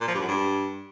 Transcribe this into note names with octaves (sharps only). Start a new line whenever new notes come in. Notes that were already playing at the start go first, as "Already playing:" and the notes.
A#2
F3
G2
F#2
G2